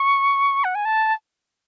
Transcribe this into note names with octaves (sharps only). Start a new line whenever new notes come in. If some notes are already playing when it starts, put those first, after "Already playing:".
Already playing: C#6
F#5
G#5
A5